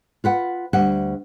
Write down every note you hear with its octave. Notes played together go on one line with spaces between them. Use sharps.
F4 B4 F#5
D2 G3 F#5